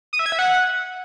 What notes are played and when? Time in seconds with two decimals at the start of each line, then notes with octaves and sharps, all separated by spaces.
0.13 D#6
0.19 E5
0.26 G#6
0.32 E5
0.39 F#5